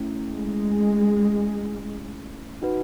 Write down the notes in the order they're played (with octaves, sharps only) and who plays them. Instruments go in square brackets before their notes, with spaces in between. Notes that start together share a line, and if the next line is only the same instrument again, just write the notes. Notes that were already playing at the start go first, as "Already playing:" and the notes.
Already playing: [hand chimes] A3 C#4 E4
[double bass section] G#3
[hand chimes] D#4 F#4 B4